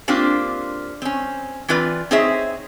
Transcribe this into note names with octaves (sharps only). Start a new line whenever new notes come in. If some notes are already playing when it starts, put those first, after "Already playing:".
A#3 C4 D4 F4 G4
C4 C#4
E3 C4 F4 B4 D5
C4 D#4 G#4 C5 C#5 E5